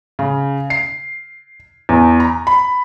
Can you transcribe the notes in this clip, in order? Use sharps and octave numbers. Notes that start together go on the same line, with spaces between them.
C#3
C7
E2
A#5
B5